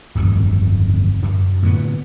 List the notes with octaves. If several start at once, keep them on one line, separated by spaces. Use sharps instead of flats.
D1 G1 F2 D#3
F#2
A2 D3 B3